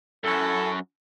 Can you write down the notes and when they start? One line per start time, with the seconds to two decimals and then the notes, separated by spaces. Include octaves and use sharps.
0.24 F#2 C#4 E4 F#4 A4